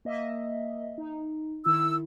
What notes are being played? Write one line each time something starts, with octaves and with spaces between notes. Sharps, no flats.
A#3 D#5 E5
D#4
D#3 E4 E6